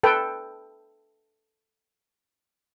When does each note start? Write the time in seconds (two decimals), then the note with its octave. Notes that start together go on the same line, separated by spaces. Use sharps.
0.03 A4 B4 G5